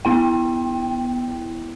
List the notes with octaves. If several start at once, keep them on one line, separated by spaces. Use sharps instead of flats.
B3 E4 G5